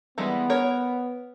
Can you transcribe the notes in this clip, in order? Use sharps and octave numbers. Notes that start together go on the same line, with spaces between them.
E3 G3 G#3 B3
A#4 C#5